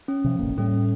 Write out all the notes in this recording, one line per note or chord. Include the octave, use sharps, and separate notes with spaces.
C#4
C3 F3
E1 A1 A#3
A2 G3 C#4